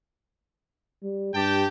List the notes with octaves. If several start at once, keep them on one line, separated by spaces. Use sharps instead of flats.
G3
G2 G4 G5 A5